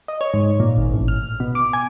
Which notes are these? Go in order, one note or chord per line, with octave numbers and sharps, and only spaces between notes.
D#5
C#5
G#2
A#2
G#1
A1
F6
B2
D6
G#5